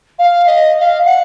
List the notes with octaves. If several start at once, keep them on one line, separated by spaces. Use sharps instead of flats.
F5
D#5
F5
F#5